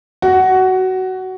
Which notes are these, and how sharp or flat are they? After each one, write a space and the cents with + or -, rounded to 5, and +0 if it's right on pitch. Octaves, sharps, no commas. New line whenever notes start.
F#4 +15